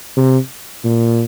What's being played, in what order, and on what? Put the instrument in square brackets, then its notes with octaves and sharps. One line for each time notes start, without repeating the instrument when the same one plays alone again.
[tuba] C3
A#2